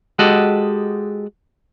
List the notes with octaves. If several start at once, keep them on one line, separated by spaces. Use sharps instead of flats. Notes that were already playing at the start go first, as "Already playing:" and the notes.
G#3 F#4 G4 A4 D#5 F#5